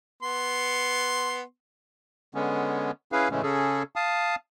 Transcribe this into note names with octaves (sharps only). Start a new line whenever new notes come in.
B3 C6
D3 G#3 B3 C#4
C#4 E4 G#4 B4 F5
A2 C#3 E3 G#3 A3 C#4
C#3 C#4 G#4 A4
F5 A5 D#6